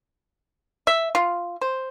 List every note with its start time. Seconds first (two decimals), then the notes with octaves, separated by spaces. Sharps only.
0.87 E5
1.15 F4
1.61 C5